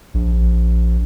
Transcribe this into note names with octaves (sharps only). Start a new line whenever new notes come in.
A#1